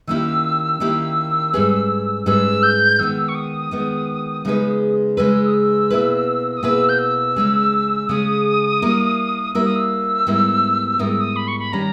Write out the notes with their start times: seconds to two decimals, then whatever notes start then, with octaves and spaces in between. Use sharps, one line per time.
0.07 D#3 A#3 C#4 E4 G4 E6
0.80 D#3 A#3 C#4 E4 G4 E6
1.53 G#2 G3 C#4 G#4 B4
2.26 G#2 G3 C#4 G#4 B4 E6
2.63 G6
2.99 D#3 G#3 B3 E6
3.29 C#6
3.35 D#6
3.71 D#3 G#3 B3
4.45 C#3 G#3 D#4 G#4 B4
5.17 C#3 G#3 D#4 G#4 B4 E6
5.47 D#6
5.54 E6
5.90 B2 A#3 E4 G#4 B4
6.57 D#6
6.63 B2 A#3 E4 G#4 B4 E6
6.89 G6
6.99 E6
7.36 C#3 G#3 C#4 G#4
8.09 C#3 G#3 C#4 G#4 D#6
8.82 G3 A#3 E4 A#4
9.54 G3 A#3 E4 A#4 E6
9.65 D#6
9.76 E6
10.27 G#2 G3 B3 E4 A#4
10.99 G#2 G3 B3 E4 A#4 D#6
11.10 E6
11.20 D#6
11.36 B5
11.48 C#6
11.59 B5
11.72 D#3 G3 C#4 A#5